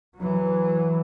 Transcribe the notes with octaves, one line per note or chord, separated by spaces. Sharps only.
E3 F#3